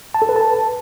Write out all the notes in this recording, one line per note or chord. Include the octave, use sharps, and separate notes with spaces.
A5
A4
B4
A5